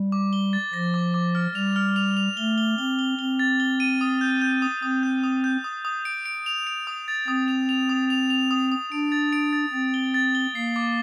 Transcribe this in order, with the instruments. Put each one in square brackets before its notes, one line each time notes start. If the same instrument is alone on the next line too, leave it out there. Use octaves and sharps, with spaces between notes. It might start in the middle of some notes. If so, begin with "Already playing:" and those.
Already playing: [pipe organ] G3
[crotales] D6
G7
A6
[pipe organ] F3 [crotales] A#6
[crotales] D6
D6
F6
[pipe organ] G3 [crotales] F7
[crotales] F6
F7
F7
[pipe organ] A3 [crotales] G7
[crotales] G7
[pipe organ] C4 [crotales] G7
[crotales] G7
[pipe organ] C4 [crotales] G7
[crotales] A6
G7
D#7
D#6
G6
G6
D#6
[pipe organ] C4 [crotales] D#6
[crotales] G6
D#6
G6
D#6
D#6
D7
D7
F7
D7
D#6
A6
[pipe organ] C4 [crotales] D#6
[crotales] F7
F7
D#6
F7
F7
D#6
D#6
[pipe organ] D4 [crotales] D7
[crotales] A6
D7
A6
[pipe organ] C4 [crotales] A6
[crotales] G7
A6
G7
[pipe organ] A#3 [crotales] C7
[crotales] D6